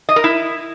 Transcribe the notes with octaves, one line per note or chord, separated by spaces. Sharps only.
D#5
A#4
E4